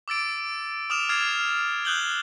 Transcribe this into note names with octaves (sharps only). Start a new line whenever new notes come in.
D6 E6 A6 D7
D6 D#6 F6 E7 F7
D6 F6 G#6 A6 C7 E7
D#6 F#6 G6 F#7 G7